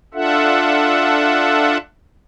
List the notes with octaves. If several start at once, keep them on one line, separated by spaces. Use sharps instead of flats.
D4 F4 A4 E5 F#5